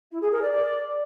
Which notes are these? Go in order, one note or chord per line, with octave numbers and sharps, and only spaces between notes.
E4
G#4
A#4
D5
D5